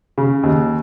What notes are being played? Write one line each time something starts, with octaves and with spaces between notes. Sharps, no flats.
C#3
D#2